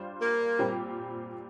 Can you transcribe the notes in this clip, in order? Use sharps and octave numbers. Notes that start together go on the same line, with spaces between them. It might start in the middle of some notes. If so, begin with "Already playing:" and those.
Already playing: G3 D4 F4 C5
A#3
A#2 G3 C4 G4